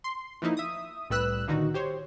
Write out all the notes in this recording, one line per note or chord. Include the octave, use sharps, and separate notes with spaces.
C6
E3 F3 A#3 D#4 E4
E5 D#6
C2 A2 G3 B4 E6 F#6
A#2 D3 D#3 D#4 F#4
G4 C5 C#5